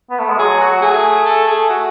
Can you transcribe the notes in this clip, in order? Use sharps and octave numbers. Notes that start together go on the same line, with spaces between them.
B3
A3
G#3
F#3 G#4
F#4
A3 G#4
A4
G#4
F#4